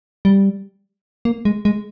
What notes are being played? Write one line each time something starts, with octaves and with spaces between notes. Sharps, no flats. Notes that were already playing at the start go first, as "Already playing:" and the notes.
G3
A#3
G#3
G#3